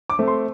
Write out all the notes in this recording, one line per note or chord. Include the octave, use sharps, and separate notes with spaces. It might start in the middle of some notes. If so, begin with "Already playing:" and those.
D6
A3 C4
C6